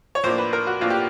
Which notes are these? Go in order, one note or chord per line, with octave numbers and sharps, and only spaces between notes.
C#5
A2 F3 A#3 D4 C5
B4
A#4
F#4
A2 F3 A#3 D4 F4
G4